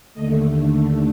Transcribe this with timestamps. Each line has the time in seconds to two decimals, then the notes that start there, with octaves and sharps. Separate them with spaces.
0.14 D#2 D3 A3 D#5